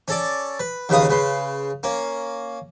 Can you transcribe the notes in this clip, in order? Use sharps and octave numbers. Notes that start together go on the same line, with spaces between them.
C#4 A4 D5
B4
D#2 C#3 B4 F5 D#6
C#3 B4 C6
A#3 C#4